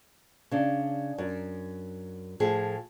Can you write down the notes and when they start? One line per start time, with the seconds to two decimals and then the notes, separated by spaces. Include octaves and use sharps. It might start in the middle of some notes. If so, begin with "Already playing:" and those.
0.51 C#3 D4
1.18 F#2
2.40 A2 F3 A3 G#4